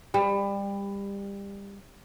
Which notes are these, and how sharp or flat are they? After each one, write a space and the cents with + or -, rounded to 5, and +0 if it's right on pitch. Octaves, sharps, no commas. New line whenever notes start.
G3 +25